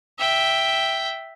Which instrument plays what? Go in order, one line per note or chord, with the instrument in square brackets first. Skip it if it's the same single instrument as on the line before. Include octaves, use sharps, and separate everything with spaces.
[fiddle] E5 G5